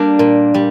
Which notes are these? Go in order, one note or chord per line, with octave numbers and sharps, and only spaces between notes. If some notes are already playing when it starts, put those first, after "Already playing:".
Already playing: G3 A#3 D4
A#2
G3